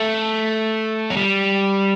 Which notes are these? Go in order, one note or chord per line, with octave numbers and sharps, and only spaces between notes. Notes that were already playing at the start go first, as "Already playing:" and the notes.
Already playing: A3
F#3
G3